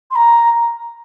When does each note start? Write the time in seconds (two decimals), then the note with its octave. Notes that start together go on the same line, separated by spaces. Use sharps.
0.10 C6
0.15 A#5